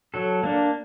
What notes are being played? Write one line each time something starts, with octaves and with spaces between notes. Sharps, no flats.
F#3 A4
A#3 D4